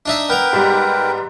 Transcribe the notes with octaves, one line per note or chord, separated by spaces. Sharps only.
D4 D#4 E5
B3 A#4 B4 G5 A#5
G#2 G3